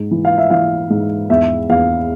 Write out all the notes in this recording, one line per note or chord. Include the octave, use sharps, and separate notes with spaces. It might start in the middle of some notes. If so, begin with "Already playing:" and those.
Already playing: G#2
E3
F5
E5
E3 F5
G#2
E2 E5
E2 F5